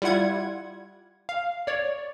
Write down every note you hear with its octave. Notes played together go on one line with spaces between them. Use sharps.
G3 E4 F4 F#5 G#6
F5
C#5 D5